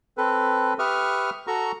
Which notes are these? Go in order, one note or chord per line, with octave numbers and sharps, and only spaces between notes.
C4 A4 B4
G4 B4 E5 C#6 D#6 F6
F#4 A4 A#5 C#6